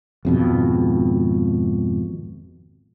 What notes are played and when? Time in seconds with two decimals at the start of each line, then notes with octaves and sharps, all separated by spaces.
0.25 G#1 F2 B2